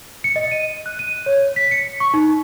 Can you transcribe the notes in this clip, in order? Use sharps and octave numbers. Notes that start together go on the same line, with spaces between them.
C#7
D#5
D#7
F#6
D#7
C#5
B6
C#7
C#6
D#4